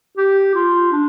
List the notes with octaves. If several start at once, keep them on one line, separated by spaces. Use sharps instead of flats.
G4
F4
D4